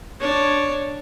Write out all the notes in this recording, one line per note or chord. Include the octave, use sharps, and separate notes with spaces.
D4 C#5